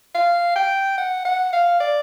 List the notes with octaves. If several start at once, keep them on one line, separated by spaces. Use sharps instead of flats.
F5
G5
F#5
F#5
F5
D5